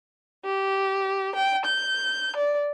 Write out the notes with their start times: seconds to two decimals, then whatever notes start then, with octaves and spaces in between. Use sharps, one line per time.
0.44 G4
1.35 G5
1.64 G6
2.36 D5